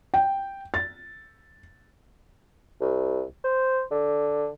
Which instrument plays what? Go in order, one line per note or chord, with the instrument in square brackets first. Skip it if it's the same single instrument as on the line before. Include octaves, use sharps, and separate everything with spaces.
[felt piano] G5
A6
[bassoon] C2
C5
D3